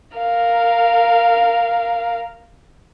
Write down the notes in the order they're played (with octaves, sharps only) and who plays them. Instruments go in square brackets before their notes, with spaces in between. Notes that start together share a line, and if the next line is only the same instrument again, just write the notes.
[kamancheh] A#4 F5